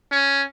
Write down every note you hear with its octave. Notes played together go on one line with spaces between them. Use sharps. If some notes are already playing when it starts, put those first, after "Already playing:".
C#4